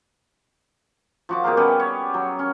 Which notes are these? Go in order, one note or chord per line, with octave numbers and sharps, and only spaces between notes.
F3 F#4 D6
B2 G4 G#4 A#4
G3 B3 C#4 G4
C#5
F#3
C#4